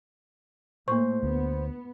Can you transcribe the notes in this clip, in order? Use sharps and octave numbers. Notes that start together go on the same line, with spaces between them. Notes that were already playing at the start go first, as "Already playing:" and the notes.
A2 A3 A#3 C5 C#6
D2 B3